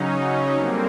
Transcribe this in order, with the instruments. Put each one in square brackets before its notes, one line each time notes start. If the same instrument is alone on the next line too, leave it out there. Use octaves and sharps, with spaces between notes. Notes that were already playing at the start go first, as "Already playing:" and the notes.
Already playing: [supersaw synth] C#3 F#3 C#4 D#4
D3 G3 A#3 C4